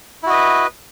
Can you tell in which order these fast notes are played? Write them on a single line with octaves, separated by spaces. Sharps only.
E4 F#4 D#5 B4